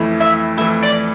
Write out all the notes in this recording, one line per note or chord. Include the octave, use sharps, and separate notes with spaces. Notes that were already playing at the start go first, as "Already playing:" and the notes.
Already playing: F2 E3 A3 E4
E5
F2 E3 A3 E4 E5
D5